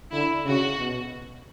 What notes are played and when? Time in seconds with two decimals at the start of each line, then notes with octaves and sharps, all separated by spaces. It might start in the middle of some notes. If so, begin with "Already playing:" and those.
0.12 D3 E4
0.45 C#3 F#4
0.79 B2